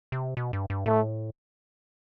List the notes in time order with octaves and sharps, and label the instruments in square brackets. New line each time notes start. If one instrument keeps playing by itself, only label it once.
[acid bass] C3
B2
G2
G2
[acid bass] A2 [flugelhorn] A3